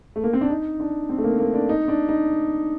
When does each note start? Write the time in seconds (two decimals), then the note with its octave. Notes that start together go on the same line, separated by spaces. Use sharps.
0.16 A3
0.24 A#3
0.33 C4
0.41 D4
0.50 D#4
0.80 D4
1.09 C4
1.18 A3
1.24 A#3
1.38 A#3
1.54 D4
1.69 D#4
1.88 D4
2.09 D#4